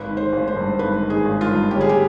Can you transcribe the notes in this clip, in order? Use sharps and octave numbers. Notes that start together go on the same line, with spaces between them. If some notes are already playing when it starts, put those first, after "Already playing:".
Already playing: G#1 B4
D#3
C5
G#1
C5
G2
G#1 B4
D#3
G#4
G#1
F4
G2
G1 G4
G#4
G4